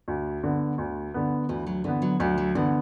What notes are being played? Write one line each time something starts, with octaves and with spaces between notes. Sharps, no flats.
D2
D3 B3
D2
D3 B3
D2 E3
F#3
D3 E3 B3
F#3
D2 F#3
F#3
D3 E3 B3